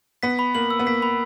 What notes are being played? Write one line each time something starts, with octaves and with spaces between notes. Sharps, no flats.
B3 B6
B5
A#3 F#7
E6
B3
A#3 B6
B5